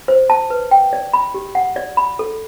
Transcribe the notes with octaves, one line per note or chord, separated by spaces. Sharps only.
C5
A5
B4
G5
D5
B5
G4
F#5
D5
B5
A4